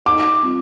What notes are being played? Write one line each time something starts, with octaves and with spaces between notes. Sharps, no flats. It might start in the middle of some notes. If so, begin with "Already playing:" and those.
D#4 A4 D#5 D6
G3 C4 F4